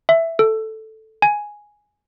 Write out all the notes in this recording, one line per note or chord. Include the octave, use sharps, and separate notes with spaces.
E5
A4
G#5